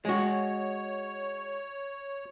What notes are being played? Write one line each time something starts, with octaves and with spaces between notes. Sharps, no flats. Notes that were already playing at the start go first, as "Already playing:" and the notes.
G#3 F#4 C#5